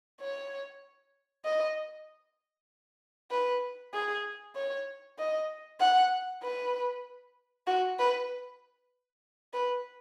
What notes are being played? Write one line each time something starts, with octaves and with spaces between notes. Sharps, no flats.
C#5
D#5
B4
G#4
C#5
D#5
F#5
B4
F#4
B4
B4